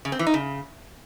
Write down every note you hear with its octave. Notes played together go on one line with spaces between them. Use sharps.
C#3
C4
E3
D#4
C#3